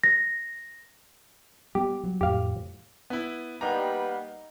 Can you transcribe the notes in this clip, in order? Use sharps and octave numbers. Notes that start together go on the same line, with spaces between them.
A#6
G3 B3 G4
F#3
F2 A2 G4 F5
B3 E4
G3 A#3 B3 D#4 A#5